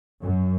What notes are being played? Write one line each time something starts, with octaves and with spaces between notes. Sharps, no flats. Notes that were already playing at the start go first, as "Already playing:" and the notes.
F#2